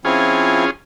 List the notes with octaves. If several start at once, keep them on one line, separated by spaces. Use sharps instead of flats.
F3 C4 C#4 E4 F4 G#4